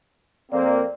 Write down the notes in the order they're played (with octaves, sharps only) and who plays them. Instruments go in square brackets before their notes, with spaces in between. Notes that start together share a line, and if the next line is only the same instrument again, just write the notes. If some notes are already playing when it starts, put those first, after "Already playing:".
[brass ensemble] F2 A#3 C4 [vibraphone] D5